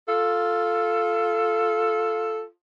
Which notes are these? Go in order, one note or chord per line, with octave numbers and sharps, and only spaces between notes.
F4 A4